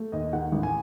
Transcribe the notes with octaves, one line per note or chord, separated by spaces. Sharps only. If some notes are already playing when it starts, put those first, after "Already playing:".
Already playing: A3
D#2 D#5
D#3 F#5
A1
G#5